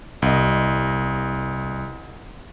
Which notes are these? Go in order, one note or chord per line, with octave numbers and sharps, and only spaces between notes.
C2 D#5